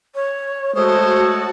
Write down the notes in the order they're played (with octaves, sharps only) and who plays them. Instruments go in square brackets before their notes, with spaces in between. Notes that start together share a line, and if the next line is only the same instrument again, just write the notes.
[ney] C#5
[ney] G#3 [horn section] A3 A4 C#5 [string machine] F#4 A5 [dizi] C5